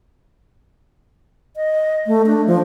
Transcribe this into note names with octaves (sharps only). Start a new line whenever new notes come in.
D#5
A3
D4
F3